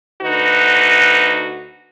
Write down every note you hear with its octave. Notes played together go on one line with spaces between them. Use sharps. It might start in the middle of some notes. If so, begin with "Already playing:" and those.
D2 D3 D#4 F#4 B4